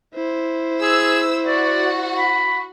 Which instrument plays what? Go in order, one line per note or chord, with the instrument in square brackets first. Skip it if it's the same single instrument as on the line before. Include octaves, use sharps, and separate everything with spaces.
[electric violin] E4 C5
[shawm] G#4 [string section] E6
[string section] F#4 [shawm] D5
[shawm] B5